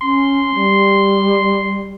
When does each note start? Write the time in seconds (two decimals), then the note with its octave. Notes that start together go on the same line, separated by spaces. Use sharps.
0.01 C#4 C6
0.55 G3